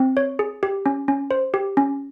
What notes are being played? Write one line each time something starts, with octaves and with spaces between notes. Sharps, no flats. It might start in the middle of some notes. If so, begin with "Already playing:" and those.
Already playing: C4
C#5
G#4
G4
C#4
C#4
C5
G4
C#4